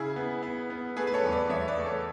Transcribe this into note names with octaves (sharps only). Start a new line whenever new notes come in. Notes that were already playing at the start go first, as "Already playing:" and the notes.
Already playing: C#3 E4 G#4
B3
B3
B3
A3 G#4 B4
B4
A4 C#5
E2
B4 D5
E2 C#5 E5
B4 D5
A3
A4 C#5